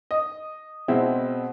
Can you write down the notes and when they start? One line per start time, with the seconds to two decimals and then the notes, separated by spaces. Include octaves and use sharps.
0.11 D#5
0.88 B2 G#3 C4 E4